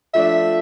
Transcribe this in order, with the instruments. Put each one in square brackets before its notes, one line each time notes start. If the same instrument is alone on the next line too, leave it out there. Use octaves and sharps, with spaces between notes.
[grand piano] F3 A3 D4 [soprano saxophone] E5